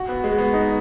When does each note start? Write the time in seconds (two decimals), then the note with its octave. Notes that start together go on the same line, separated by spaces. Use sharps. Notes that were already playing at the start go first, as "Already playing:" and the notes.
Already playing: F#4
0.09 B3
0.24 G#3
0.38 B3
0.54 D#4